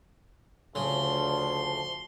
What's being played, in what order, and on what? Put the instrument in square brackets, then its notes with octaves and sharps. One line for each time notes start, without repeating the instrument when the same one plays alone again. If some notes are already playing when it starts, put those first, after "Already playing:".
[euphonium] D2 [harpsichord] C#3 [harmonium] F3 D4 [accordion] C6